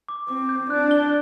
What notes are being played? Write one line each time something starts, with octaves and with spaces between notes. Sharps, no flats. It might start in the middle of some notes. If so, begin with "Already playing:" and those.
D6
C4 D6
G6
D4 F#6
G7